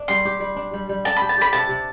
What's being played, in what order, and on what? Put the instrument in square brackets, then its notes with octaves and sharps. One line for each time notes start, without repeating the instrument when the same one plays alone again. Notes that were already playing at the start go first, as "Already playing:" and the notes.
Already playing: [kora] D4
[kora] G3 [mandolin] C6
[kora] G4
G3
D4
G3
G3
[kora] D4 [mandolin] A5
[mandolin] B5
[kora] G4
[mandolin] A5
[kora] G4 [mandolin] B5
[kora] C3 [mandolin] A5
[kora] C3